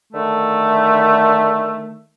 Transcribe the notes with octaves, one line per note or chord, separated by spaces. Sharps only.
D3 D#3 A3